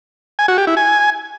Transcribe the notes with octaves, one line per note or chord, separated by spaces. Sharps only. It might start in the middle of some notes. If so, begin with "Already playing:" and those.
G#5
F#4
G4
E4
G#5